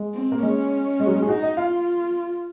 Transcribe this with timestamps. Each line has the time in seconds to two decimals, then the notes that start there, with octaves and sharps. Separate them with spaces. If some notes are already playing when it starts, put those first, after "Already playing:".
Already playing: G#3
0.14 C4
0.32 A#3
0.42 G#3 C#4
1.00 G#3
1.07 F#3
1.14 G#3
1.22 G#4
1.28 D#4 F#4
1.42 D#5
1.57 F4 F5